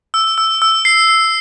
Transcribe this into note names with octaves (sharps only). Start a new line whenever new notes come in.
E6
E6
E6
C7
C7